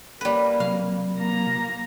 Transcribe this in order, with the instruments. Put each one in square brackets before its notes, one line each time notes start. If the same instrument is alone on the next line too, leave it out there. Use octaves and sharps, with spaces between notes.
[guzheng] G3 B4 [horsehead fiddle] A#3
[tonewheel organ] C3 F#3 [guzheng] F5
[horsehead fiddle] A#3 A#5